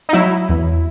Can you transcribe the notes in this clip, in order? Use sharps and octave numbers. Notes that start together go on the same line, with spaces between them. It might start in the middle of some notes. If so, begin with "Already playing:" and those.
D#4
F#3 E4
E2